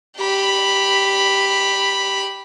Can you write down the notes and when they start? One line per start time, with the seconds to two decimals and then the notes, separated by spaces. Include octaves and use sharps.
0.18 G4 B5